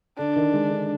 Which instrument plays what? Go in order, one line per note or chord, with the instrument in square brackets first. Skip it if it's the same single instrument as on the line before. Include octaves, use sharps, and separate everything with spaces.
[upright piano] D3 [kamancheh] D4
[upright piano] D#3
G#3
D3